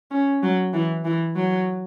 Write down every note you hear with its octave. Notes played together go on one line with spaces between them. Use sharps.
C#4
F#3
E3
E3
F#3